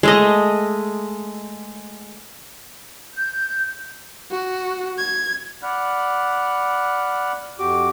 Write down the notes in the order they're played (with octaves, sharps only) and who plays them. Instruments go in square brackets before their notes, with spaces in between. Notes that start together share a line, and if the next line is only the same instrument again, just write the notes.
[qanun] G#3 A3 D#5
[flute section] G6
[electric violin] F#4
G#6
[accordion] D5 F#5 B5 F6 F#6
F2 F#4 G4 D6